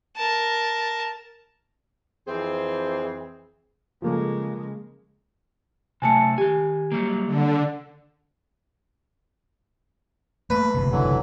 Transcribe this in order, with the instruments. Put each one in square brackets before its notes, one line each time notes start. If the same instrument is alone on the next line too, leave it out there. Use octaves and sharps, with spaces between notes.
[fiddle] A#4 A5
[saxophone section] F2 E3 C4 G#4 C5
[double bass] C#3 G#3 [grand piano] F3 A#3 A4
[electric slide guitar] C3 F#3 A3 [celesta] G#5 A5 C#7
[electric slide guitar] D#3 G#5 [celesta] G4
[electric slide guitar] F#3 G3 A#3
[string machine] D3
[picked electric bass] A3 A#3 [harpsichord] B4
[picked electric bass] F#1 D2 C3
[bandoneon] D3 E3 F#3